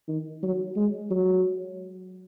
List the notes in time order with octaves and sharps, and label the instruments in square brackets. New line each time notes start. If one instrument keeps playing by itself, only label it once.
[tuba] D#3
F#3
G#3
F#3